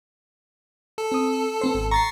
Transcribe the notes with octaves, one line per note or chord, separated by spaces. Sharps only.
A4
C4 D#6
B3 C4 C5
G#1
A#5 C#6 A6 C7